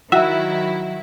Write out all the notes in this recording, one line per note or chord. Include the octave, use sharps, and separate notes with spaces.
D#3 F#3 E4 F#4 E5